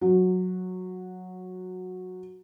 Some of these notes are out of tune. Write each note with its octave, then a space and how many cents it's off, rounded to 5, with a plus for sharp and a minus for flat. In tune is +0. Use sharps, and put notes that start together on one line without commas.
F#3 -10